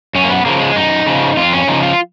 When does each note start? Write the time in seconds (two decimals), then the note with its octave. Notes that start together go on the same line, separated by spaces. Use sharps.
0.15 F#2 C#4
0.24 A#3
0.30 B3
0.45 C#3 F3 A#3
0.60 G#3
0.76 F#2 D#4
1.06 C#3 F3
1.37 F2 F4
1.53 C#4
1.67 C#3 F3 D#4
1.83 F4